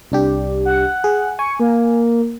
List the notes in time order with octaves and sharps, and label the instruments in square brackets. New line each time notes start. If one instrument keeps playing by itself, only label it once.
[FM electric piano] C2 D4 G4
[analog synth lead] F#5
[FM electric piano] G#4
[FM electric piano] G#5 [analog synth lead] C#6
[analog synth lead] A#3